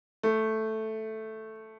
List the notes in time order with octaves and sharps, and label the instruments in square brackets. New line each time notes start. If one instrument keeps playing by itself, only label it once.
[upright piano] A3